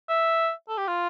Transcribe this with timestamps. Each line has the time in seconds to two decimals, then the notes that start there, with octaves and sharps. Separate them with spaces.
0.09 E5
0.68 A4
0.78 G4
0.88 F4